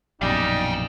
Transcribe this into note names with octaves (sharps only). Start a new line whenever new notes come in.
A#1 F#2 B2 G3 D#4 F5 G#5